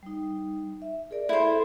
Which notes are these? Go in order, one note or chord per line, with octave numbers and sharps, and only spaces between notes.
G3 D#4
E5
G#4 A#4 D5
E4 A4 C5